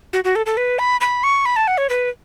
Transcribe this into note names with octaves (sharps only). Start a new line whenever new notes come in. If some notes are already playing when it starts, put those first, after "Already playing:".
F#4
F#4
A4
A4
B4
B5
B5
C#6
B5
A5
F#5
C#5
B4